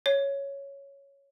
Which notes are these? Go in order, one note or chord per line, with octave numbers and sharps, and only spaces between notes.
C#5